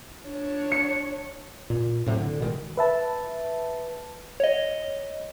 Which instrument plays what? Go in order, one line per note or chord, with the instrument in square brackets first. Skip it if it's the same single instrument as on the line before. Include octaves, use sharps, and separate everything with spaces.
[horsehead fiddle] D4 C#5
[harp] C#7
[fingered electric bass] A#2
A2 C3 F#3
D3
B2 D#3 G#3
[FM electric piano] B4 E5 A5
[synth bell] C#5 D#5